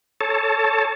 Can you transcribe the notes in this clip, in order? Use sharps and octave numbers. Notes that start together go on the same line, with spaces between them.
A4 C#5 A5